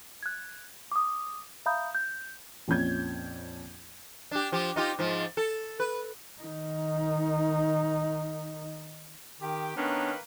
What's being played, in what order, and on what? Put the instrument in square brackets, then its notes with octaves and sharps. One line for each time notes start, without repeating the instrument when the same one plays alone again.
[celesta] F#6 G#6
D6 D#6
E5 F5 A#5 B5 D#6 G6
G6
[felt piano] A#1 F2 C#4 G6 G#6
[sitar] D4 G4
F3 G4
D#4 F4 G4
G#2 F3
A4
B4
[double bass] D#3 D#4
[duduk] D#3 [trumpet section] G4
[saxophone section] D#3 C#4 [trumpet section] A#3 B4 [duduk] B3 [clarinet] D4